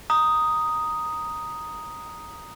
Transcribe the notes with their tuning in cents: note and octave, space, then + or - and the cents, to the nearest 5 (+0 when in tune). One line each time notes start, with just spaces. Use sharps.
A#5 +0 D#6 +0